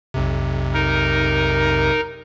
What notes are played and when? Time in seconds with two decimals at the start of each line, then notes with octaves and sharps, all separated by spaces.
0.14 B1 F2 C3
0.74 D#4 A#4